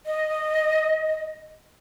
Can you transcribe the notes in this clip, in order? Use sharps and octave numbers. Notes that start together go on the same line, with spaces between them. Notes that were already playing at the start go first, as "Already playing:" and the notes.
D#5